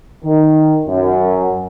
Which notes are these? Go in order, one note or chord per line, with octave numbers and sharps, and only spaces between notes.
D#3
F#2